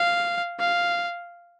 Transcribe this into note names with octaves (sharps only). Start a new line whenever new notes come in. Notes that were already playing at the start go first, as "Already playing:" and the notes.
Already playing: F5
F5